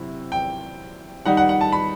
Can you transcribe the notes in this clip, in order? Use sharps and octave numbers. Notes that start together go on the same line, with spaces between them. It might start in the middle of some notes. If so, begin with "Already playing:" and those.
Already playing: C3 F#3 C4 E4
G5
D#3 G3 D#4 F#5
F#5
F#5
A5
B5